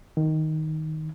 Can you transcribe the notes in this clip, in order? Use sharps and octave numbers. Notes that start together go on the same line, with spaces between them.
D#3